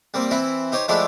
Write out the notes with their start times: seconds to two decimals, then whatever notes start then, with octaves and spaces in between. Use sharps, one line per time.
0.14 G3 A#3 C4
0.31 E3 C4 E4
0.72 D#4 G4 C5 C#5
0.88 F3 G#3 A3 D4 E4 G4